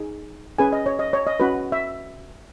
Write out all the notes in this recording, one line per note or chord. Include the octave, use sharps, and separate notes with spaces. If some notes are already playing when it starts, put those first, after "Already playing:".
Already playing: D#4 G#4
C#4 G#4 B4 G#5
D#5
C#5
D#5
C#5
D#5
C#4 F#4 B4
E5